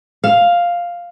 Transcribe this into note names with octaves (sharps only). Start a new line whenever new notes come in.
F5